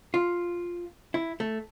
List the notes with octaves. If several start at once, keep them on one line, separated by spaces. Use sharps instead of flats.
F4
E4
A3